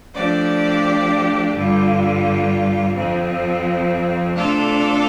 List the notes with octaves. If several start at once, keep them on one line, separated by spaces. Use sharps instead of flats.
F3 A3 D4 G4 D5
G2 D3 G3 F4
F2 F3 C4
C3 A3 D4 F4 A4